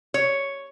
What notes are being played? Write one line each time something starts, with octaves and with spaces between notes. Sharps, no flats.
C#5